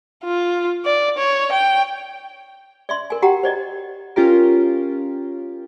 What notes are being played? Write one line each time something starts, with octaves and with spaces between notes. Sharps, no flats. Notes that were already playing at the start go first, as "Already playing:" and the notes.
F4
D5
C#5
G5
D5 E5 C6
A#4 G#5
F#4 G4 F#5 G5 A#5
C5 D5 D#5
C#4 F4 G4 A#4